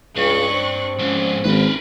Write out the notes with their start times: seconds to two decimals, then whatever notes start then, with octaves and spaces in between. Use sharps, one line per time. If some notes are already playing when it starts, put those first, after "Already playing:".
0.16 C#2 G2 C#6 F#6
0.54 C4
0.99 G#2 F3 C#4
1.44 G#1 A#4 B4